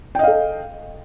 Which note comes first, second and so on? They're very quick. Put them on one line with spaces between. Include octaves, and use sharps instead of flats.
G5 D#5 F5 A4